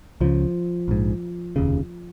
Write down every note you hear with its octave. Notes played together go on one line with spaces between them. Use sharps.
C#2 C#3 F3
A#1 G#2
F1 D#2 C#3